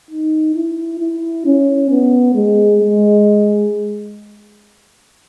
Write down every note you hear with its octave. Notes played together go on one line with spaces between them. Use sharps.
D#4
E4
E4
C#4
B3
G#3
G#3